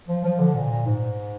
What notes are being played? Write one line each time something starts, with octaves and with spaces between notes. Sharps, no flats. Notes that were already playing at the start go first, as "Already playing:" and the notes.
F3
F3
D3
A#2
A#2
G#2